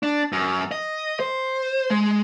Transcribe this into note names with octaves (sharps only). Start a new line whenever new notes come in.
D4
F#2
D#5
C5
G#3